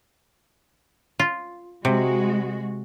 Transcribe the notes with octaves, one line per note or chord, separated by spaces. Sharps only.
F4
C3 G#3 F#4